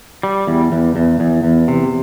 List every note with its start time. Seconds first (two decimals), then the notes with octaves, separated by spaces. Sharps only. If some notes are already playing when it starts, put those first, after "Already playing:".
0.23 G3
0.47 E2
0.72 E2
0.96 E2
1.20 E2
1.44 E2
1.68 C3